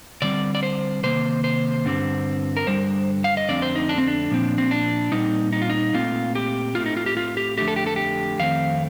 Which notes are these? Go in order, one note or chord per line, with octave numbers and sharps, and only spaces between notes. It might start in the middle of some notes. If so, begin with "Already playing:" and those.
D3 G3 C4 D5
D5
C5
C3 D#3 A#3 C5
C5
G2 D3 G3 C4
A#4
G2 D3 G3 C5
F5
D#5
F2 D3 A3 C4 D5
C5
D#4
D4
C4
D4
A#2 F3 C4
C4
D4
A#2 G3 C4 D#4
D#4
F4
D#4
A#2 A3 C4 F4
G4
A2 A3 C4 F4
D#4
F4
G4
F4
G4
F2 D3 A3 G4
A4
G4
A4
G4
F2 D#3 A3 C4 F5